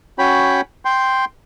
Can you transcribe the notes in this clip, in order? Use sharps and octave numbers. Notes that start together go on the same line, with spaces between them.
C#4 F#4 C#5 G5 B5
G5 C6